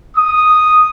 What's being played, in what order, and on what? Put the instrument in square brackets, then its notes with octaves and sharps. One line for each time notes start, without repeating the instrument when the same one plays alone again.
[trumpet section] D#6